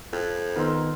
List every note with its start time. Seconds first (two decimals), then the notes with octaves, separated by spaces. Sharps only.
0.13 F2
0.56 D#3 B3 D#4 A#4 E5 C6